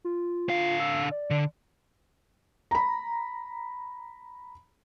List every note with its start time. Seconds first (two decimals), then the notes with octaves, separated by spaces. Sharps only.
0.05 F4
0.49 D3 F5
0.80 E6
1.11 D5
1.31 D3
2.71 A#5 B5